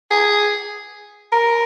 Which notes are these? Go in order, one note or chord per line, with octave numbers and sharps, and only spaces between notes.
G#4
A#4